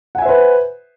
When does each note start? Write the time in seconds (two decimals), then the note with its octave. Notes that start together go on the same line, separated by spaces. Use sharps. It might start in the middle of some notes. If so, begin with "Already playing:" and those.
0.15 F#5
0.18 G#5
0.22 E5
0.25 C5
0.29 B4